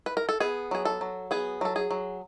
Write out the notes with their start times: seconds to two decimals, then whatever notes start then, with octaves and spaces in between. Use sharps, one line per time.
0.06 B4
0.17 A#4
0.29 A4
0.40 B3 G#4
0.71 F#3 G#4
0.85 A4
1.01 F#3
1.31 B3 G#4
1.61 F#3 A4
1.76 G#4
1.91 F#3